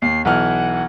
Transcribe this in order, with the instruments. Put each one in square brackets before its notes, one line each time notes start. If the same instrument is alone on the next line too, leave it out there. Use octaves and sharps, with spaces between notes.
[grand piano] D#2 [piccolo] C7
[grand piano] B1 E3 F6 [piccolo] F#5